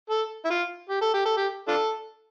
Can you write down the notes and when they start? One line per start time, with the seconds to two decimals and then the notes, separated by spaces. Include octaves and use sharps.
0.10 A4
0.45 E4
0.50 F4
0.89 G4
1.01 A4
1.14 G4
1.25 A4
1.37 G4
1.68 D4 F4 A4